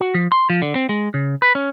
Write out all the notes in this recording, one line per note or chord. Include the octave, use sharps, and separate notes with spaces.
F#4
F3
C6
F3
D3
C4
G#3
C#3
B4
C#4